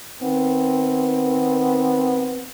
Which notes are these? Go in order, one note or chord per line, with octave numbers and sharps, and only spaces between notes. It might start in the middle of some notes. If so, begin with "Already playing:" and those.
D#3 B3 C4